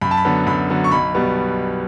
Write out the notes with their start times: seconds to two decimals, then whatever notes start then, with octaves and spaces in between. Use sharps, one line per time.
0.01 F#2 B5
0.11 A5
0.17 B5
0.25 D3 F#3 B3
0.47 F#2 B5
0.70 D3 F#3 B3
0.84 C#6
0.91 B1 B5
1.14 B2 G3 B3